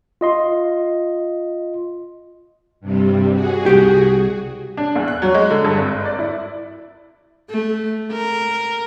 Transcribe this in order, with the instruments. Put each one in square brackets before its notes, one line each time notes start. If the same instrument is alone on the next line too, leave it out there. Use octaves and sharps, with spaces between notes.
[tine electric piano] F4 D#5 C6
[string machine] G2 C3 G3
F#4 G#4
[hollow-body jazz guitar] C2 F#2 G4
[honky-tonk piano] D4
E2
F#6
F#3
G#3
D3
G2
G#1
D5
E4
[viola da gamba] A3
A#4